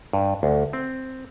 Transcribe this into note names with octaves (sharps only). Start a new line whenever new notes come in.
G2
D2
C4